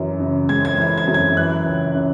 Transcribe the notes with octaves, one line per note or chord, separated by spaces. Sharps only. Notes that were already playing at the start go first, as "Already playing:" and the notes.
Already playing: F#2 E3
C#3
G#3 G#6
G#6
E3 G#6
G#6
F#2
G#6
E3 F#6
C#2
C#3